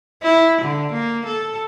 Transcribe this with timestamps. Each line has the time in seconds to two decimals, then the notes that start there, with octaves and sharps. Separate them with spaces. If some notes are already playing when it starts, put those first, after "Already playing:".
0.23 E4
0.61 D3
0.93 A#3
1.26 A4